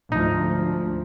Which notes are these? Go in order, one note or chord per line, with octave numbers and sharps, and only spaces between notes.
D2 G#2 F3 D#4